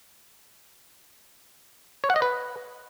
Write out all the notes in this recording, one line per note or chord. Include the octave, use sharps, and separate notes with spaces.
C#5
F#5
D#5
B4